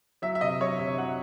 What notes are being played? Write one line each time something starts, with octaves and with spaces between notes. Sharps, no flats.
F#3 E5
E5
C3 D#5
F#3 C#5
C3 E5
F#3 F#5